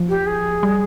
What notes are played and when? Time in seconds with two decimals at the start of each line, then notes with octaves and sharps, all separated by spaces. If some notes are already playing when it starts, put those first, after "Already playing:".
Already playing: F3
0.08 G4
0.26 G#4
0.63 G3